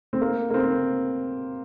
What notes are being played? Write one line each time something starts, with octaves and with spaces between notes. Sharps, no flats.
C4
A#3
A#3
C4